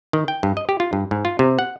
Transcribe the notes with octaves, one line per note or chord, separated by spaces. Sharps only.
D#3
G5
G2
D#5
G4
F4
G2
G#2
F4
C3
F#5